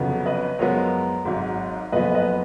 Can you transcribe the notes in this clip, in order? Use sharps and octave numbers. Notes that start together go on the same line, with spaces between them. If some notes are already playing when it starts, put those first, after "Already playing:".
Already playing: F2 C#3 F#3 B3
B4 D#5
F#2 F3 G#3 B3 A#4 C#5
G#1 G#2 F#3
F#1 F2 F3 B3 B4 D#5
B4 D#5